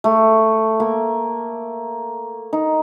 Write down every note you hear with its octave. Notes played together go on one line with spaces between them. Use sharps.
A3
A#3
D#4